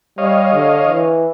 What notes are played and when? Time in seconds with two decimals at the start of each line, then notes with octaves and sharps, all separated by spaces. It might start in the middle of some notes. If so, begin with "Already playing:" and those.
0.18 G3 C#5 D#5 F5
0.53 D3
0.87 E3